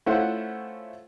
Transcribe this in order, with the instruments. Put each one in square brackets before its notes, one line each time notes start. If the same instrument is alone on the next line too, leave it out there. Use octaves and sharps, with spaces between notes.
[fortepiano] A3 C#4 E4 F4 C5 F#5